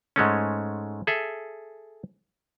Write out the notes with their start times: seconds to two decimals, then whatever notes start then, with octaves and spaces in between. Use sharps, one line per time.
0.16 G#2 G#3 A3 C#4
1.07 G#4 A4 E5